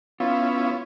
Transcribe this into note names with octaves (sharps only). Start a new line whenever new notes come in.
B3 C#4 E4 F4